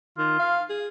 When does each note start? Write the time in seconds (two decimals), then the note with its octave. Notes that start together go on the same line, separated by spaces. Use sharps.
0.18 D#3 F4
0.39 F5
0.69 G#4